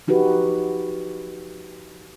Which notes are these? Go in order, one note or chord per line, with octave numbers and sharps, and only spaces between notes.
F3 D#4 F#4 G4 B4